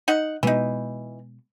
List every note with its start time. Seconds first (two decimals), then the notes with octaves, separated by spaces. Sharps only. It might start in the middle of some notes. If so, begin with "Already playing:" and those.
0.08 D#4 F#5
0.43 B2 E3 G#3 B3 D#4